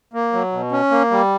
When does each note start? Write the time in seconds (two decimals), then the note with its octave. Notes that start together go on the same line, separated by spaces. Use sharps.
0.13 A#3
0.33 F#3
0.52 B2
0.71 C#4
0.91 A#3
1.11 G3